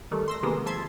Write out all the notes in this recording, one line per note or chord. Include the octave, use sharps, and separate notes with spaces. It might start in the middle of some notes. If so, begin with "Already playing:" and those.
D#3 G3 A3
C6 E6 A#6
C3 D#3 G#3 A#3 B3
F3 E5 A5 C6 G#6